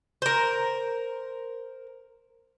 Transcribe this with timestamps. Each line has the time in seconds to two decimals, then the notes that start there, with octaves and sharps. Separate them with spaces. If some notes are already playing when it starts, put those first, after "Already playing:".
0.22 A#4 C5